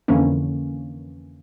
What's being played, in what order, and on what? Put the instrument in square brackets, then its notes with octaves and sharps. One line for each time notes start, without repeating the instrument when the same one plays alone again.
[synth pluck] F2 D3 E3 A#3 C#4